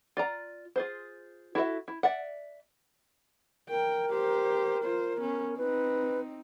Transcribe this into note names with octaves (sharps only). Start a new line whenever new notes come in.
F4 D5 A#5
F4 G#4 C5
E4 F#4 A4 C#5 E5
E4
D5 E5 F#5
A#4 G5
G4 C5
F4 C5
B3 C#4
C4 D#4 B4